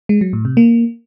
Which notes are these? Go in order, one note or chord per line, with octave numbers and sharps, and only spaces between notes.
G#3
F#3
A2
C3
A#3